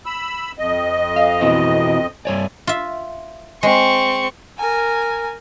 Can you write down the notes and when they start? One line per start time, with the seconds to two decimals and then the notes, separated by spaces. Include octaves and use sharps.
0.06 B5 E6
0.59 F2 D#5
1.16 F5
1.41 B2 E3 C4
2.25 G2 C#5 D5 G#5
2.67 F4 E5
3.63 G#3 C4 C#6
4.58 A#4 G#5